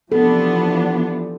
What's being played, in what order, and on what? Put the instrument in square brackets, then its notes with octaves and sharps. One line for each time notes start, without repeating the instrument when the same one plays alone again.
[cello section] C3 B3 D4 [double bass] E3 F3 [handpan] A4